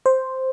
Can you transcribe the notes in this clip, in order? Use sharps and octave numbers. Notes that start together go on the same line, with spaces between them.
C5